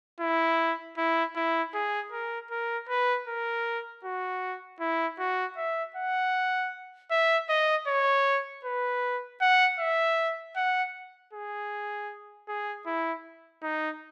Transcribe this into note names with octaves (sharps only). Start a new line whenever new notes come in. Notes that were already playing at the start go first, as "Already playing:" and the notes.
E4
E4
E4
G#4
A#4
A#4
B4
A#4
F#4
E4
F#4
E5
F#5
E5
D#5
C#5
B4
F#5
E5
F#5
G#4
G#4
E4
D#4